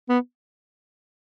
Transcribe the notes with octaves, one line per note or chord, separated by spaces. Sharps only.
B3